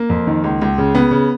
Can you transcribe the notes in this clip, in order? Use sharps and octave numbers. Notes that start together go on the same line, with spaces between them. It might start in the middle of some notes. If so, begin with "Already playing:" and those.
Already playing: A#3
F2
D#3
C#2
C#2
C#3
C#3 B3
C#3